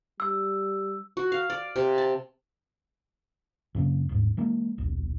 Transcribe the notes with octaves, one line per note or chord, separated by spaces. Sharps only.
G3 E6
F#4
F5
D5
C3
A5
F#2 C#3 A#3 C4
D#1 G#2
E3 G#3 A#3
D#1 B1